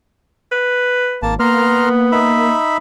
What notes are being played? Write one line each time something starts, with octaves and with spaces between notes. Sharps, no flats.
B4
G#1 A#3 A5
A#3 B3 A#5 C6 F6
D#4 E5 B5